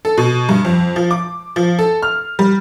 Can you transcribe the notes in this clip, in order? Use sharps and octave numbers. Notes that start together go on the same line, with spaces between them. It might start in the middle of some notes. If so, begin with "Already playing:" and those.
A4
B2
G2
F2
F3
D6
F3
A4
F6
G3